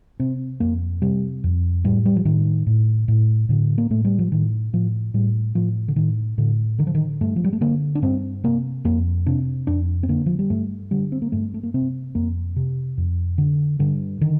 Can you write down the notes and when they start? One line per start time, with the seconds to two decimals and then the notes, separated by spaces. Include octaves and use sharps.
0.20 C3 C4
0.60 F2 A#3
1.02 C3 G3
1.44 F2
1.84 A2 G3
2.05 G3
2.16 F3
2.25 A2 D#3
2.67 A2
3.08 A2
3.49 A2 D3
3.78 A#3
3.90 A2 A3
4.05 G3
4.19 F3
4.32 A2 D#3
4.73 A2 F3
5.14 A2 G3
5.55 A2 F3
5.88 D3
5.96 A2 D#3
6.38 A2 D3
6.79 D3 D#3
6.87 F3
6.95 D#3
7.21 G2 A3
7.36 F3
7.44 G3
7.53 A3
7.61 D3 A#3
7.95 D4
8.02 G2 C4
8.44 C3 A#3
8.85 F2 A#3
9.26 C3 D4
9.67 F2 D4
10.03 C4
10.09 D3 A#3
10.26 F3
10.39 G3
10.50 G2 A3
10.91 D3 G3
11.12 C4
11.22 A#3
11.32 G2 A3
11.54 A3
11.63 A#3
11.74 C3 C4
12.15 F2 A#3
12.56 C3
12.98 F2
13.38 D3
13.79 G2 D3
14.21 D3 D#3